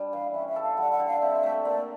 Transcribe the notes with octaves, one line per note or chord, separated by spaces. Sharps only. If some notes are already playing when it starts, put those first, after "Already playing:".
Already playing: G3 D4
E3 F5
C#4 E5
E5
A4
F5
G3 F#5
F#5
D3
F5
C4 E5
A3
A#3 D5